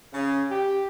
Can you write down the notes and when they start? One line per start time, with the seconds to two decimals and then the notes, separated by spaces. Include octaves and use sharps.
0.14 C#3
0.51 G4